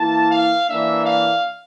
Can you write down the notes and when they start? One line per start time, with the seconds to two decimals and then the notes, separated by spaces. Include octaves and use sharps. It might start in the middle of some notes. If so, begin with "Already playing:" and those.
Already playing: E3 A#3 E4 A5
0.30 F5
0.68 E3 A#3 D4 E5
1.05 F5